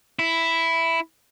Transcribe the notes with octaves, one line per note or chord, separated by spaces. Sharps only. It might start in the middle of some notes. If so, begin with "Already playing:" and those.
E4